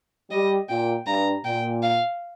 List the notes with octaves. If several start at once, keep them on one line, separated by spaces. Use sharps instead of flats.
G3 D#5
A#2 G5
G2 A#5
A#2 G5
F5